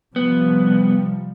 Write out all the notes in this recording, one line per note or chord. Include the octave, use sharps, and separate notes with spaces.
C3 F3 G3 B3